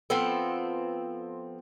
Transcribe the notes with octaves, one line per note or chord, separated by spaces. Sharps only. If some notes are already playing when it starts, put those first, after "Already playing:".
F3 B3 C4 A4